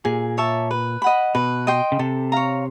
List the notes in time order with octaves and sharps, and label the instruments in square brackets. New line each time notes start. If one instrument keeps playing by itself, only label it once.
[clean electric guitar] A#2 [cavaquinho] G#4
[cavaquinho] C#5 E5 A5
B4
D#5 F#5 B5
[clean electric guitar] B2 [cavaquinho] B4
[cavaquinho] D#5 G5 C6
[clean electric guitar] C#3
[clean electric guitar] C3 [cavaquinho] A4
[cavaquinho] C#5 F5 A#5